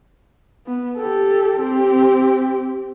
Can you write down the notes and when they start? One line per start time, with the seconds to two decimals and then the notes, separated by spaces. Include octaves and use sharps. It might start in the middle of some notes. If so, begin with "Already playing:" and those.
0.67 B3
0.98 G4 A4
1.60 C4 G4